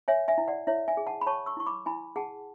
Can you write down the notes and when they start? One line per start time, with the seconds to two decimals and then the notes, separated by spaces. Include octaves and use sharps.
0.08 C#5 E5 G#5
0.28 E5 G#5
0.38 E4
0.48 D5 F#5
0.67 E4 C#5 E5
0.88 E5 G#5
0.97 G#4
1.07 F#5 A5
1.21 B5
1.26 C#5 A5 C#6
1.46 C#6 E6
1.57 E4 C#6
1.66 B5 D6
1.86 E4 G#5 B5
2.16 G#4 F#5 A5